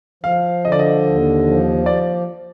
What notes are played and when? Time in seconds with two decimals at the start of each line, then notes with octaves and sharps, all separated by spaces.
0.24 F3 F5
0.65 D3 D#5
0.72 D5
0.79 D#5
1.06 D#2
1.46 F3
1.86 D5